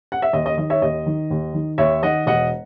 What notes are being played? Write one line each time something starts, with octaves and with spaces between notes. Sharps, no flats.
F#5
E5
D#2 D#5
D#5
D#3 D#5
C#5 E5
D#2 D#5
D#3
D#2
D#3
D#2 C#5 E5
D#3 D#5 F#5
E1 D#5 F#5